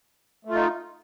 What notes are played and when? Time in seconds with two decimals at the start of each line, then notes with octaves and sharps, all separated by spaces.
0.45 A3
0.49 F4
0.54 D#4